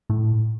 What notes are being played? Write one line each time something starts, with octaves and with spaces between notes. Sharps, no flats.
A2